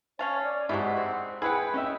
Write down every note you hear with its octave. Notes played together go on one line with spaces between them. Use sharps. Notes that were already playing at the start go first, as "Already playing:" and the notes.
C#4 C#5 F5 A5
D5
G#2 F#3 G#3 E4 G4 F#5
C4
E4 G#4 B4 F#5 G5
C#4 D#4 E5